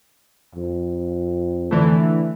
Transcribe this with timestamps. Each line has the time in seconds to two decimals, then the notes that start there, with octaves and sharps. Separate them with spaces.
0.55 F2
1.71 D3 E3 A3